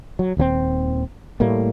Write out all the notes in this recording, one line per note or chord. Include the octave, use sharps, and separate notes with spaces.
F#3
D#1 D#2 F3 C4
A2 G3 A3 A#3